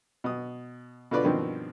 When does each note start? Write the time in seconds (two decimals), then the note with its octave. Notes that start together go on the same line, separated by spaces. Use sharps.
0.24 B2 D#6
1.11 B2 D3 F4 B4 D5
1.24 G2 B2 D#3 F3 C4